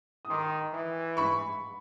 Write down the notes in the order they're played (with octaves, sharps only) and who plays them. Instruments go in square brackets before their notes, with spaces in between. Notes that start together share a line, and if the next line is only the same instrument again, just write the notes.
[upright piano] D#6
[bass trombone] D#3 [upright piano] C6 D6
[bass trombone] E3
[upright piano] B5 C#6